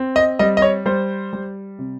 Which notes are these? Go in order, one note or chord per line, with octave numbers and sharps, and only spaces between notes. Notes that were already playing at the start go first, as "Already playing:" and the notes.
Already playing: C4
D#5
G3 D#5
D#5
C#5
G3 C5
G3
C3